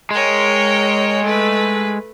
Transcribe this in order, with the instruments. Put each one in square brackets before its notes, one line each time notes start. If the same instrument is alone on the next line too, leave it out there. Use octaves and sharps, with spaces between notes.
[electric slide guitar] G#3 [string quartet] A#4 C#5 G5
[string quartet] A3 B4